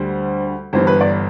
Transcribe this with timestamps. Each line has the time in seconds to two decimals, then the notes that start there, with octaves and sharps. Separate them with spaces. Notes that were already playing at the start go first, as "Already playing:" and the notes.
Already playing: D2 D3 G3 C5
0.73 G1 G2 E3 C5
0.87 B4
1.01 D5